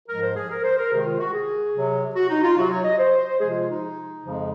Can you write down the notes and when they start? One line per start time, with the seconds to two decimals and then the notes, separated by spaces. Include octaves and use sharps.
0.08 G#2 F3 G#3 A#4
0.22 C5
0.36 G#4
0.50 A#4
0.63 C5
0.78 A#4
0.91 C3 D#3 G#3 G#4
1.05 F4
1.19 F#4
1.33 G#4
1.75 C3 F#3
2.15 F#4
2.29 D#4
2.43 F4
2.57 C3 F#3 F#4
2.71 C#5
2.85 D#5
2.98 C5
3.39 C3 F3 G#3 G#4
3.50 F4
3.61 F4
3.71 D#4
4.23 F2 C#3 F3 G#3